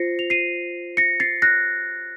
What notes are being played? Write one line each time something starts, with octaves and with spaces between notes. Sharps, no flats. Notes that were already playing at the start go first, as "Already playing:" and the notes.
Already playing: F4 C5 A#6 C7 C#7
F7
C7 D#7
A#6 C#7
A6 C7
F#6 A#6